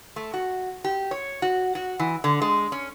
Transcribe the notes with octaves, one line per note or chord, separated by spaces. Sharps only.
A3
F#4
G4
C#5
F#4
F#4
E3
D3
G#3
C#4